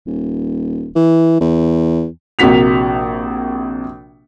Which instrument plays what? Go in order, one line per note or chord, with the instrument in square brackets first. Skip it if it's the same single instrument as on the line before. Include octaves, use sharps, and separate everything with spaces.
[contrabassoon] D#1
E3
E2
[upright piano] A#1 C3 A#3 F#4 B6 F7